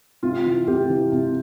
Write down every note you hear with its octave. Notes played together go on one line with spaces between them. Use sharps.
C3 F4
E3
C3 G4
E3
C3